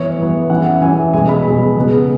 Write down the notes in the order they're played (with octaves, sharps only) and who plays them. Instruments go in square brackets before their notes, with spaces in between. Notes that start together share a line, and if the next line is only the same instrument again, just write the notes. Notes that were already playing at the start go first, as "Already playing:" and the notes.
Already playing: [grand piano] E3 B3 C#5
E3 B3
E3 C#4 F#5
E3 C#4 G#5
B2 G#3 B3 G#5
B5
B2 G#3 B3
C#3 G#3 B3